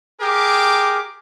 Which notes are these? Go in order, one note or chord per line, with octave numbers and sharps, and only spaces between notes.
G4 G#4 A#4 D6